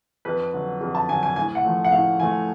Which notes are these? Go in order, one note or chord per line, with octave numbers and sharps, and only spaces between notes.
F2 B4
D3 F#3
F2
A5
D3 F#3 G#5
G#5
A2 G#5
F#5
F3 A3
F#5
A2 F5
F3 A3 G#5